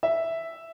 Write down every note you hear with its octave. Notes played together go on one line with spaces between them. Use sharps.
E5